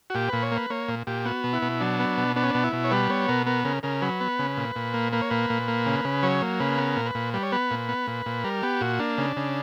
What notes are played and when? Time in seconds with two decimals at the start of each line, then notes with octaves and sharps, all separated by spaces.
0.10 F#4
0.15 A#2 G4
0.29 A#2 B4
0.42 C#5
0.52 A#3 B4
0.70 A#3 C#5
0.88 A#2
1.07 A#2 G4
1.25 B3 F#4
1.44 B2
1.53 E4
1.62 B2
1.80 F#3 D4
1.99 B3
2.17 B2
2.36 B3 D4
2.43 C#4
2.50 B2 D4
2.64 E4
2.73 B2
2.84 C#5
2.91 G3 B4
3.10 B3 C#5
3.28 B2 A#4
3.47 B3 A#4
3.65 C#3 A#4
3.83 C#3 A#4
4.02 F#3 B4
4.21 B3
4.39 C#3
4.57 A#2
4.76 A#2
4.94 A#3
5.12 A#3 B4
5.21 C#5
5.30 A#2 B4
5.50 A#2
5.68 A#3
5.86 C#3
6.05 C#3
6.23 F#3 C#5
6.41 A#3
6.60 C#3 B4
6.78 B3 A#4
6.97 A#2
7.06 B4
7.15 A#2
7.34 G3 B4
7.43 C#5
7.52 B3 B4
7.71 A#2
7.89 B3
8.07 A#2
8.26 A#2
8.44 G3 A#4
8.63 B3 G4
8.81 A#2 F#4
8.99 A#3 D4
9.18 C#3
9.37 C#3